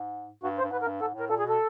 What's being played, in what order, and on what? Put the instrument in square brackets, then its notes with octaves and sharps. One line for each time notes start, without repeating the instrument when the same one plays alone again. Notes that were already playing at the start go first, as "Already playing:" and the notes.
Already playing: [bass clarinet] G#2
[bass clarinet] G2 [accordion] F#4
[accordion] C5
[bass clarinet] G2
[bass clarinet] G#2 [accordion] B4
[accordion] A#4
[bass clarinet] G2
[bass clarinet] G#2 [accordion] A4
[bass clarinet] A2
[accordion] A#4
[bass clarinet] A#2 [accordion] A4
[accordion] G#4
[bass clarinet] B2 [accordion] A4